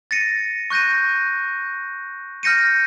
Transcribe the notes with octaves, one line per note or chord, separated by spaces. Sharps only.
A6 A#6 C#7 D#7
C#6 F#6 G6 A#6 D#7
F6 G6 A#6 C#7 D#7